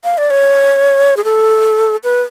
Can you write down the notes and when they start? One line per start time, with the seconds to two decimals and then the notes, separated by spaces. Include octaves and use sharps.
0.04 F5
0.18 D5
0.30 C#5
1.17 G#4
1.24 A4
2.04 B4